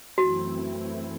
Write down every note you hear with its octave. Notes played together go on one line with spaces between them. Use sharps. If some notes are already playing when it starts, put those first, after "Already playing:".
F#2 E3 A3 C4 E4 F#4